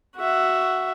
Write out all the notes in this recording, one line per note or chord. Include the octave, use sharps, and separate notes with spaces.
F#4 E5